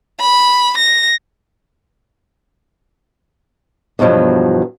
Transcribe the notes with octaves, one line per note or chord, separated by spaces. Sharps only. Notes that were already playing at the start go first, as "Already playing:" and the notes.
B5
A#6
E2 G2 B2 F3 F#3